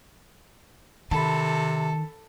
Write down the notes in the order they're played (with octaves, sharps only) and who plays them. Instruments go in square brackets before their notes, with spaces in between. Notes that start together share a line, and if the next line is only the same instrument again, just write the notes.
[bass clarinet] C3 [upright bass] D#3 [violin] A4 [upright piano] A5 B5